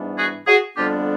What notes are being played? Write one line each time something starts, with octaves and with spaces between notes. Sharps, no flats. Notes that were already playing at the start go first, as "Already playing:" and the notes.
Already playing: G#2 E3 G3 B3 D4
F#4 G#4
F#4 G#4
F2 D3 G3 B3 D4 F4 G4